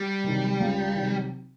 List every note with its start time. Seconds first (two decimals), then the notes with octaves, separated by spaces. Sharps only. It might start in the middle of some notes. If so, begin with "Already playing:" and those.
Already playing: G3
0.24 C3 D#3 F#3
0.60 C#2
0.95 C3 D#3 F#3